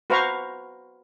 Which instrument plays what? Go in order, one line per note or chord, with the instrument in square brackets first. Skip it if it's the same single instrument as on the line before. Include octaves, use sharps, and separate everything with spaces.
[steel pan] F#4 B4 C5 F5 A#5 C#6